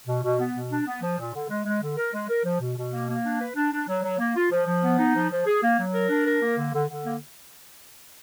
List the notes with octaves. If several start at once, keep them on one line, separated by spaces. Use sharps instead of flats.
B2
B2
B3
B2
D4
B3
F3
A#2
D3
G#3
G#3
D3
A#4
G#3
A#4
F3
B2
B2
A#3
A#3
D4
B4
D4
D4
F#3
F#3
A#3
F4
F3
F3
B3
D#4
F3
F3
G#4
A#3
F#3
A#4
D4
A#4
A#3
D3
D3
D3
A#3